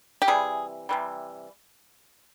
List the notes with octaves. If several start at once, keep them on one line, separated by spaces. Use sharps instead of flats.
G4
C3 E3 G3 G#4
C3 E3 G3